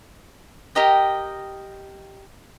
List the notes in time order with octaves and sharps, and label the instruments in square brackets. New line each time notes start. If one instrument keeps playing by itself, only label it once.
[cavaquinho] G4 A#4 D#5 G5